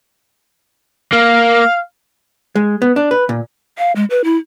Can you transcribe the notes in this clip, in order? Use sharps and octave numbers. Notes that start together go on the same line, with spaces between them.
A#3 F5
G#3
B3
D4
B4
A#2
F5
G#3
B4
E4